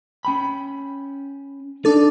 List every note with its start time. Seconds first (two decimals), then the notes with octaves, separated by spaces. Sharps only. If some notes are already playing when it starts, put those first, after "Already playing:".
0.25 C#4 G5 B5
1.85 D4 D#4 A4 D5